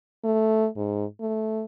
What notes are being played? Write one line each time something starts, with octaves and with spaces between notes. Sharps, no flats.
A3
G#2
A3